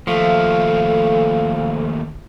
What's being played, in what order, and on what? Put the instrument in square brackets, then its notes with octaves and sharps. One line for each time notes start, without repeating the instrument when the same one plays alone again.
[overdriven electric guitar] D#2 A3 [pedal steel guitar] F3 [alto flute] A4 [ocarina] F5